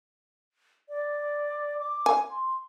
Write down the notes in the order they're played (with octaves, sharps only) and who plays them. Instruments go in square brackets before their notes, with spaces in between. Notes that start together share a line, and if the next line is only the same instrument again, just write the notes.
[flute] D5
D6
[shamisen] G#5
[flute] C6